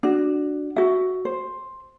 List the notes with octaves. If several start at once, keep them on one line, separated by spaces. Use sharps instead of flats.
D4 F#4
F#4 E5
C5